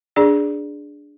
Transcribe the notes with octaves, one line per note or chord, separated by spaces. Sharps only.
D4 G#4 D5